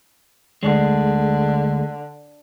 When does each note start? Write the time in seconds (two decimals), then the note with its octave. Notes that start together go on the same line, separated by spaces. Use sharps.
0.63 D2 D3 G#3